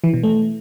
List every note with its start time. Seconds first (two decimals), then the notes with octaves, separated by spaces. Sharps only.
0.04 E3
0.14 B2
0.23 A3